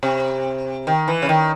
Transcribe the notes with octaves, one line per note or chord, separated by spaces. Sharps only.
C3
D#3
E3
C#3
D#3